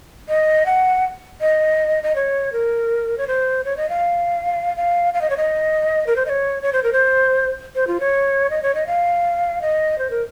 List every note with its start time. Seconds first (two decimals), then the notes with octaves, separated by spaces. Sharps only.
0.29 D#5
0.66 F#5
1.41 D#5
2.03 D#5
2.16 C#5
2.53 A#4
3.18 C#5
3.27 C5
3.65 C#5
3.77 D#5
3.89 F5
4.77 F5
5.14 F5
5.21 D#5
5.30 C#5
5.37 D#5
6.07 A#4
6.16 C5
6.26 D#5
6.29 C#5
6.63 C#5
6.73 C5
6.83 A#4
6.93 C5
7.76 C5
7.87 F4
8.00 C#5
8.50 D#5
8.62 C#5
8.75 D#5
8.87 F5
9.62 D#5
9.99 C5
10.10 A#4